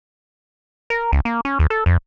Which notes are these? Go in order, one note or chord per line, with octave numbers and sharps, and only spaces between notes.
A#4
C#2
A#3
C#4
D#2
A4
F2